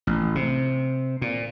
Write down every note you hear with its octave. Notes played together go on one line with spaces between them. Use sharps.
A1
C3
A#2